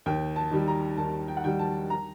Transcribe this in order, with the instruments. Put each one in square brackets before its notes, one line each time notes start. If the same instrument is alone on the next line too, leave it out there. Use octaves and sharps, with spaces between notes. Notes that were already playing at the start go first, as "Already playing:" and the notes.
[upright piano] D#2 G5
A5
D#3 G3
A#5
D#2 A5
G5
F#5
D#3 G3 G5
A5
A#5